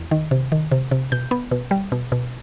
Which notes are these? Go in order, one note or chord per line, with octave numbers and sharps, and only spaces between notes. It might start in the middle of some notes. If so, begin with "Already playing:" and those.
Already playing: E2
D#3
C3
D#3
C3
C3
B2 G6
B3
B2
G3
B2
B2